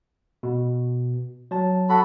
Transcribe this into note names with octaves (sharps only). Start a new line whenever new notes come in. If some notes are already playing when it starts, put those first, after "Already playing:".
B2
F#3 A5
F#4 A4 B5